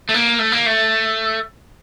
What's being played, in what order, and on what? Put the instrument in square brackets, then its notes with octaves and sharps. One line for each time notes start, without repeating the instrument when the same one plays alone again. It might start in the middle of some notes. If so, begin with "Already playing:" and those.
[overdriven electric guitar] A3
A#3
A3
A#3
A3